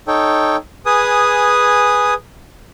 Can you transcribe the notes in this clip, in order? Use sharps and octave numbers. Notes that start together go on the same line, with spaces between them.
D#4 A4 C#5 G5
G#4 B4 G#5 D#6